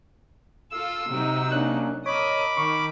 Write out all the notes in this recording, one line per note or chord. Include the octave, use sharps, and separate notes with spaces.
F4 A4 E6
C3 F#3 D#4
A#3 C#4 D4 F#6
A#4 C#5 D#5 B5 D6
D#3 C#6